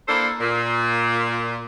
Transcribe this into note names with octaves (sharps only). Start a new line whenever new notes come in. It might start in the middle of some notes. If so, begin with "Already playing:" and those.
A#3 D4 E4 A4 C5
A#2